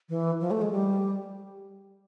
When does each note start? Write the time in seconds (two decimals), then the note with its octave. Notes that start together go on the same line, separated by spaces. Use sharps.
0.09 E3
0.41 F3
0.51 A3
0.62 G#3
0.72 G3